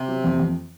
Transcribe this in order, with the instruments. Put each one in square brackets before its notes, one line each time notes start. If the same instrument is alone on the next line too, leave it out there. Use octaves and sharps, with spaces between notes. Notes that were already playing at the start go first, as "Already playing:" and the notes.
Already playing: [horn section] C3
[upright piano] F#3
F2
F2